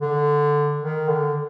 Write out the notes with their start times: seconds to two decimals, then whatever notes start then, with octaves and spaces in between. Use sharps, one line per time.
0.01 D3
0.82 D#3
1.09 D3